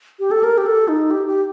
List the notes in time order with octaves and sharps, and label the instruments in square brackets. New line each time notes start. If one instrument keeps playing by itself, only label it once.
[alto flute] G4
A4
A#4
G4
A4
D#4
G4
G4